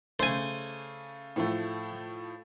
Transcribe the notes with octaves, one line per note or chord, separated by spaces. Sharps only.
C#3 A3 C5 G#5
A2 F3 A3